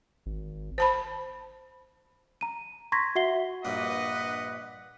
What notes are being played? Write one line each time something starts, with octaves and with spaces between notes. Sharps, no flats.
G#1
C5 A5 B5
A#5 D#7
A#5 C6 C#6 G#6 A#6 B6
F#4 E5 F#5 C7 G7
A#1 G2 A#2 B4 D#5 F#5